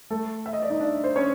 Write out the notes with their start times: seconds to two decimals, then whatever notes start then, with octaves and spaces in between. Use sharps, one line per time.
0.10 A3 A4
0.46 E5
0.53 D#5
0.62 D5
0.70 D#4 D#5
0.80 D4 D5
1.04 C5
1.16 C#4 C#5